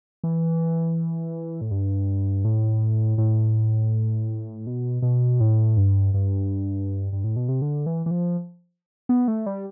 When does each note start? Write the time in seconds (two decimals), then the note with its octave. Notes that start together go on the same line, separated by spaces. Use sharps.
0.24 E3
1.61 A2
1.71 G2
2.45 A2
3.18 A2
4.67 B2
5.02 B2
5.40 A2
5.77 G2
6.14 G2
7.13 G2
7.24 A2
7.36 B2
7.49 C3
7.62 D3
7.86 E3
8.06 E3
8.11 F3
9.09 B3
9.28 A3
9.46 G3